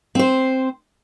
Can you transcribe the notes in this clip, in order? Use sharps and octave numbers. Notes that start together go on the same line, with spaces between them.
C4 C5